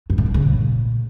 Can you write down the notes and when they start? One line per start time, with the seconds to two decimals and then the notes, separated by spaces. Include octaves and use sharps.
0.10 G2
0.18 A2
0.26 D3
0.34 C#3
0.42 A#2